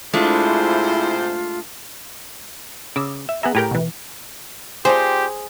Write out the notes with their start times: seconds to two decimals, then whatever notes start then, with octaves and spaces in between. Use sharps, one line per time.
0.13 C3 G#3 A3 D4 E4 F4 G#4 C5
2.96 C#3 D6 E6
3.29 E5
3.43 B3 G#4 E5 A#5
3.55 A2 G4 A#4 G#5 A#5 G6
3.71 B2 E3
4.85 F3 G3 C4 G4 G#4 C5